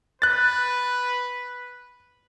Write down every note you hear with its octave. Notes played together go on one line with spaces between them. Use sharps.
B4 F#6 A6